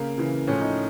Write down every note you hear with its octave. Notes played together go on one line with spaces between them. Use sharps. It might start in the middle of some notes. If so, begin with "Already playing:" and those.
Already playing: C#3 A#3
C#3 E3
A2 F3 C#4
D#4